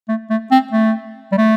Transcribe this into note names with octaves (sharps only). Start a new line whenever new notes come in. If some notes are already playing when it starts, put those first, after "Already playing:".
A3
A3
C4
A3
G3
A3